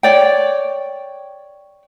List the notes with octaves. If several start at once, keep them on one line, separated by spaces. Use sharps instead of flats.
C#5 D5 G5